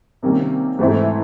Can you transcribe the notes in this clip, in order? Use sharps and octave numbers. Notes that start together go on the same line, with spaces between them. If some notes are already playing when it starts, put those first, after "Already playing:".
C3 D#3 G3 A#3 C#4
G#2 E3 A3 C4 E4